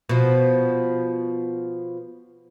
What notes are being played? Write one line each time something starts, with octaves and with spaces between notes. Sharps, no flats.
B2 F3